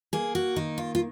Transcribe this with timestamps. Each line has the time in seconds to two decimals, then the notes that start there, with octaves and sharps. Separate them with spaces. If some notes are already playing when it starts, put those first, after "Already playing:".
0.13 A#3 G#4
0.35 F#4
0.56 D#3 D#4
0.78 F4
0.95 F4